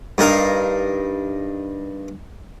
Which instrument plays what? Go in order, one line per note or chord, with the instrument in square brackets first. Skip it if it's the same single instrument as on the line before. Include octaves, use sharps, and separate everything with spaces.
[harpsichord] G2 D#4 A#4 F5